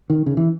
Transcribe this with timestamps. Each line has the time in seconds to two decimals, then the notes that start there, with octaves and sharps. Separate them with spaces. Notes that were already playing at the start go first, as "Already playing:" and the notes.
0.10 D#3
0.26 C#3
0.37 E3